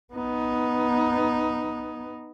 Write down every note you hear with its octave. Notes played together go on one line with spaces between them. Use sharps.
B3 D#4